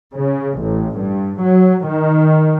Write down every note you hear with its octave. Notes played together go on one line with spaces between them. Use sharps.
C#3
A1
G2
F#3
D#3